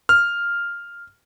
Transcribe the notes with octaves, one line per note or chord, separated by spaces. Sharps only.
F6